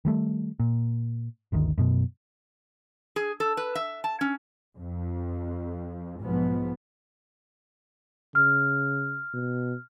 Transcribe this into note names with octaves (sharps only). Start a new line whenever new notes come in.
D#3 G3 A3
A#2
G1 D2 D#3
F#2 B2
G#4
A4
B4
E5
A5
C#4
F2
B1 G#2 F3 B3
C#3 F6
B2